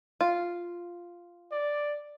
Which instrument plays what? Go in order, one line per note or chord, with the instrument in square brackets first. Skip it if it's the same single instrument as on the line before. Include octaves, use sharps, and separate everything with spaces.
[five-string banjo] F4
[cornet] D5